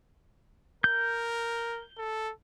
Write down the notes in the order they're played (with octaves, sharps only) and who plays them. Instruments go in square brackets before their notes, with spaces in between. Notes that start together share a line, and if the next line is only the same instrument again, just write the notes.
[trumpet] A#4 [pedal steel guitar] G6
[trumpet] A4